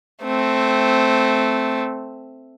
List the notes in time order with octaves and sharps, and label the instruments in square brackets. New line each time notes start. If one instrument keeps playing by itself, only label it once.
[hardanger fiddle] A3 C4